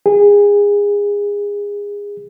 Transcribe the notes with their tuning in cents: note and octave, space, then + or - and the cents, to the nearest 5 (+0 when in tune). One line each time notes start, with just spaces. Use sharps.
G#4 -25